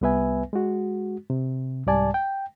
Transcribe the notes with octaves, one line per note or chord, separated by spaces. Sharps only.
C2 G3 B3 B4 E5 G#5
G#3 F#4
C3
C2 G#2 G3 D5 G#5 A5
G5